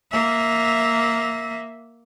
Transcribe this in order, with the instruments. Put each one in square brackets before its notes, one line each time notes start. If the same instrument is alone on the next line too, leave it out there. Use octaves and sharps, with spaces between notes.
[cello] A#3 E5